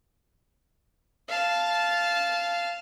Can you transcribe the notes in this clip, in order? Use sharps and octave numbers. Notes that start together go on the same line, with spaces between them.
F5 A5